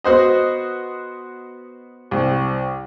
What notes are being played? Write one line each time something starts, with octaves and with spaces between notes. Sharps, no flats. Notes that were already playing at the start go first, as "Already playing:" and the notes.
B3 F#4 C5 D#5
C2